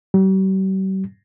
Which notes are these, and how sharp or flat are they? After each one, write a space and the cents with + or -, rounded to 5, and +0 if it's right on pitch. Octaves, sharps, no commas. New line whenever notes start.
G3 -45